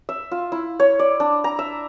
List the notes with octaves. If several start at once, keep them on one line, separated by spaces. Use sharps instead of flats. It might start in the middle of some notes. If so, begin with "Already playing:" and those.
E5
F4
E4
C#5
D5
D4
A#5
E5